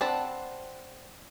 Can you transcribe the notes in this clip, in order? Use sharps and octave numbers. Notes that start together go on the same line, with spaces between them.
C4 D4 F#5 A5 B5